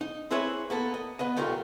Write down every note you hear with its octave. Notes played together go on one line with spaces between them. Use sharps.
D#4
C4 E4 G#4 B4 C#5 E5
A#3 B3 A4
D#5
B3 B4 D#5
B1 A3 F4 G4 A#4